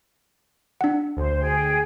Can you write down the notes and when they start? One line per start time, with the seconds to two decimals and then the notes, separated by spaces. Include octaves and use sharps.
0.81 D4 F#5
1.17 D2 C5
1.40 G#4 G5